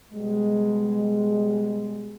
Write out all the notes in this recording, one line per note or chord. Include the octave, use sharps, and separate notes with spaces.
B2 G3 G#3